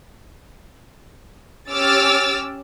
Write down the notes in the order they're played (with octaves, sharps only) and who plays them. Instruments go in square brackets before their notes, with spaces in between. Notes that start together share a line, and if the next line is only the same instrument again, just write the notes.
[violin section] C#4 G4 D6 E6 F6 A6